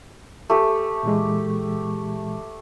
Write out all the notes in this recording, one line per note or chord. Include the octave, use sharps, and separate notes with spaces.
A3 G4
A#2 E3 G#3